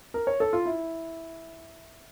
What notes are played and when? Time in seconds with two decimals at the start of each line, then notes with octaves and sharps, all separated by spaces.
0.14 A#4
0.27 C#5
0.40 A4
0.53 F4
0.66 E4